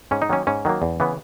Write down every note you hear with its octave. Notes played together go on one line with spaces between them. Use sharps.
G#2 C#4
D#4
D#3 F#3 A#3 C#4
G#2 C#4
D#3 F#3 A#3
E2
C#3 E3 B3